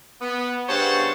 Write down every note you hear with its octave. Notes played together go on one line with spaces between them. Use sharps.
B3
G2 C#3 C5 C#5 F#5 A5